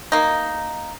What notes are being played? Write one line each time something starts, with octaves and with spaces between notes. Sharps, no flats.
A#3 D#4